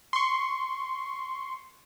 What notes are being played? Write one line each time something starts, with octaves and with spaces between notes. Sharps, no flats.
C6 C#6